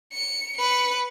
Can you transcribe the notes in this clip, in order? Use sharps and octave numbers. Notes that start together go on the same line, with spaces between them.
C#7
B4 C#7